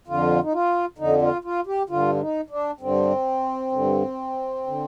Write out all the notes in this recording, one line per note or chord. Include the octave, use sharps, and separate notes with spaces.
F2 D3 F4
D#4
F4
F2 D3 D#4
F4
F4
G4
G2 D3 F4
F4
D#4
D4
G2 D3 C4
G2 D3
D3